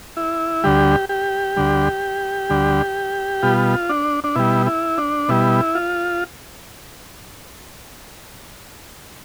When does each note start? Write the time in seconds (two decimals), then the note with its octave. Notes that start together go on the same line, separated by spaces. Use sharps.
0.17 E4
0.64 D2 D3 G3 G4
1.09 G4
1.56 D2 D3 G3
2.50 D2 D3 G3
3.43 B2 G3 F4
3.89 D4
4.24 D4
4.35 B2 G3 E4
4.66 E4
4.98 D4
5.28 B2 G3 E4
5.75 F4